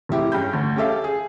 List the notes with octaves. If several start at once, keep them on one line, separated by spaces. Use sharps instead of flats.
F1 G3 E4 G4
G2 C#4 B5 G6
D2
C#4 G4 A4 E5 F5
G#4